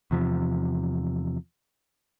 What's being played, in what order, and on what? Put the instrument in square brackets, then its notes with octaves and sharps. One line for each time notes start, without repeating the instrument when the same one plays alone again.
[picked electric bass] E2 C3 F3